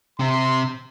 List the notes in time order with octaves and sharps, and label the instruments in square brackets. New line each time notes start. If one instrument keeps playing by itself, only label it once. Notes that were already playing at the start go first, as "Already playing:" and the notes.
[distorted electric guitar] C3 [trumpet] C6